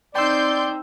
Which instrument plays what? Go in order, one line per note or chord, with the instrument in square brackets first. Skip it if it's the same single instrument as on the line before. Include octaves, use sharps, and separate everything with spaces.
[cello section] C4 D#4 [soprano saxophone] D5 [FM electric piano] G5 E6 [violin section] C6 G6